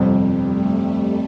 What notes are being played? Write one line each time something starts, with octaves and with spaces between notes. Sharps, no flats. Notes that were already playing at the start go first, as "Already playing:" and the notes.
Already playing: G1 F2 C3 G3
A3